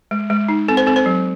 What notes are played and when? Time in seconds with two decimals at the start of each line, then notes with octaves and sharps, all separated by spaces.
0.11 G#3
0.30 G#3
0.48 D#4
0.68 C4 A4
0.77 C5
0.87 C4 A4
0.96 C5
1.06 F#3